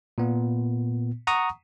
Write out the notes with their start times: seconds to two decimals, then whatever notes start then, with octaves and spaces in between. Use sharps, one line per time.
0.18 A#2 B3
1.27 F#5 A#5 C#6 D#6